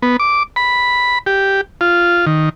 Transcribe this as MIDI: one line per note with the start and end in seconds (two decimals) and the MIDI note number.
0.02 0.17 59
0.20 0.43 86
0.56 1.19 83
1.26 1.61 67
1.81 2.25 65
2.26 2.49 51